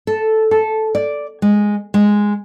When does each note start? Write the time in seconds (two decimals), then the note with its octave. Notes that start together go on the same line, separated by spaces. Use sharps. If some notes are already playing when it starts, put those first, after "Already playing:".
0.07 A4
0.51 A4
0.95 D5
1.42 G#3
1.94 G#3